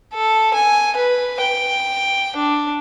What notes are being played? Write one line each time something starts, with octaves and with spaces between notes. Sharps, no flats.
A4
G#5
B4
G5
D4